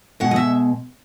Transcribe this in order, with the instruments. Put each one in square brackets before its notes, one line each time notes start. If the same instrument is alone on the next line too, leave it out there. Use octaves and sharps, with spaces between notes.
[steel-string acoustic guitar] B2 G#3 F#5
D#5
E5